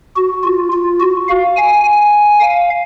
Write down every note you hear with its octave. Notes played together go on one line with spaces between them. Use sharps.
F#4
F4
F4
F#4
F5
G#5
G#5
F5